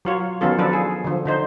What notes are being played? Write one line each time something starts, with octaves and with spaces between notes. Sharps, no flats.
F#3 F4 C#5
D#3 F#3 B3 C#4 F4 A4
F3 F#3 D4 A4 B4
G#4
D3 F3
D3 D#4 C5